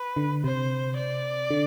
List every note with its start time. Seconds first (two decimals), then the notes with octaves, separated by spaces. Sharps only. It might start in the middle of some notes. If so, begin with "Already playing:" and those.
Already playing: B4
0.16 D3
0.44 C3 C5
0.96 D5
1.50 D3